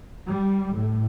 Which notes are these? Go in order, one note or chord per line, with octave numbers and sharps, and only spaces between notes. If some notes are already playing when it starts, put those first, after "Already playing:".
G3
A2